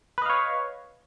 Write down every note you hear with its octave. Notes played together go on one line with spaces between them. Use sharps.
B4 C#5 D#5 F5